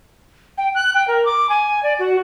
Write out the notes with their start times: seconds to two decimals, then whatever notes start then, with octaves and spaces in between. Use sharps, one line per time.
0.58 G5
0.75 F#6
0.94 G5
1.08 A#4
1.25 D6
1.50 G#5
1.83 D5
1.99 F#4